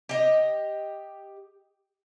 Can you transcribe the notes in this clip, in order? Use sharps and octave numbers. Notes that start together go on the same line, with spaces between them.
G4 D#5